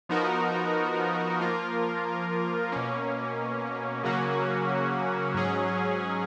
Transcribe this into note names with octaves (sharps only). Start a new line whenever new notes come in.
F3 B3 D#4 F#4 A#4
F3 A#3 F4 A#4
B2 A#3 C#4
C#3 F#3 A#3 C#4 F#4
G#2 F#3 C#4 G#4